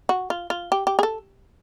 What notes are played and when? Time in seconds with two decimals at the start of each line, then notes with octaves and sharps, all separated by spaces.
0.09 F#4
0.30 F4
0.50 F4
0.72 G4
0.87 G4
0.99 G#4
1.03 A4